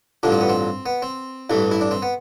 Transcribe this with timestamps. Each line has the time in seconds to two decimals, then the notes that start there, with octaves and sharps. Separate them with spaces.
0.23 A1 G2 D3 F3 D4
0.32 C4
0.41 B3
0.49 C4
0.86 B3
1.02 C4
1.50 A1 G2 E3 A3
1.71 E4
1.81 D4
1.91 C4
2.02 B3